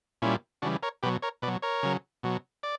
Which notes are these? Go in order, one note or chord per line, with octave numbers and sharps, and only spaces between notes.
A#2 G3 C#4 E4
C#3 E3 G3 D4 F#4
A#4 C#5
B2 F#3 G4 B4
A#4 C#5
B2 B4 D5
F#3
A#4 C#5
C#3 F#3
B2 F#3
D5